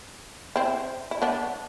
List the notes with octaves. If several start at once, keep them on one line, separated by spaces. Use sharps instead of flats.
C4 E4
E4
B3 D4